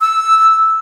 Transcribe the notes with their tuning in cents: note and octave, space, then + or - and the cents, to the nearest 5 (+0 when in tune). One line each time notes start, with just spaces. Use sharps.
E6 -5